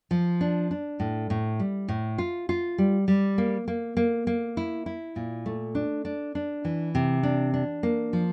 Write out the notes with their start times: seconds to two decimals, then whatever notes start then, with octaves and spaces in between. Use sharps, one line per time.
0.11 F3
0.41 D4
0.71 D4
1.00 A2
1.30 A2
1.60 G3
1.88 A2
2.18 F4
2.49 F4
2.78 G3
3.08 G3
3.38 A#3
3.68 A#3
3.97 A#3
4.27 A#3
4.57 E4
4.86 E4
5.16 A#2
5.46 A3
5.75 D4
6.05 D4
6.35 D4
6.65 E3
6.95 C3
7.23 D4
7.54 D4
7.83 A#3
8.13 F3